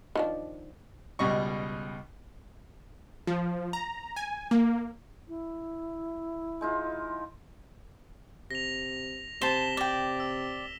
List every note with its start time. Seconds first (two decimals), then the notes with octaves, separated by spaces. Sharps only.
0.15 D#3 F3 D4
1.19 C#2 B2 G3 D#5 C#6
3.27 F3
3.73 A#5
4.16 G#5
4.51 A#3
5.27 E4
6.61 G#3 D#4 F4
8.51 C3 A#6 F7
9.41 C3 C5 A5 B6 E7 G7
9.77 D5 G5
10.20 E6